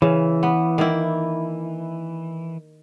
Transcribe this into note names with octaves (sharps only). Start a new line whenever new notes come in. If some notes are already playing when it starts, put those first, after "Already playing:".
C#3 E3
B3
D#3 A#3 E4